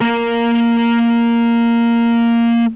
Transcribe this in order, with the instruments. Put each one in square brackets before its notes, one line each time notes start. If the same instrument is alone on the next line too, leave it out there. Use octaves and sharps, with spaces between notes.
[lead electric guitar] A#3 A#4